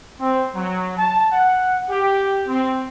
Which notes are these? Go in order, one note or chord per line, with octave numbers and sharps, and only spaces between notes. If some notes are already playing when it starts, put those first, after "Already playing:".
C4
F#3
A5
F#5
G4
C4